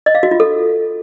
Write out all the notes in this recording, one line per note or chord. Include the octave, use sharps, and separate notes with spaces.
D#5
F5
F#4
F4
A4